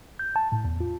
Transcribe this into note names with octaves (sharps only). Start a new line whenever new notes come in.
G6
A5
A2
E2
F4